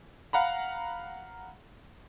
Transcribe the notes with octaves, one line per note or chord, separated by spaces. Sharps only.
F5 F#5 A#5 B5